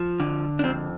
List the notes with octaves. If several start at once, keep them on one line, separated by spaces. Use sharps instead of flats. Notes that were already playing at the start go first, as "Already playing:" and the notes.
Already playing: F3
D3
D4
F2 C4